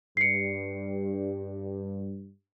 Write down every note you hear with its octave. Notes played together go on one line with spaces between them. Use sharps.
G2 C7 C#7